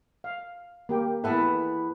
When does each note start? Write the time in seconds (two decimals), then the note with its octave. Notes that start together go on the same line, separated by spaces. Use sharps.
0.24 F5
0.89 A#3 G4 G5
1.24 E2 B3 A4 B4 E5